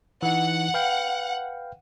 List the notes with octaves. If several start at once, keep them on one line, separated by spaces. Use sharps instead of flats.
E3 D#4 F#5
B4 F5 G5